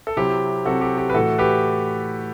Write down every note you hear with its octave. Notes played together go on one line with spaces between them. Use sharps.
A4
C3 F#3 C4 E4 G4
C3 F#3 C4 E4 F#4 A4
G4
G4
B4
A2 E3 A3 F#4 A4
G4 B4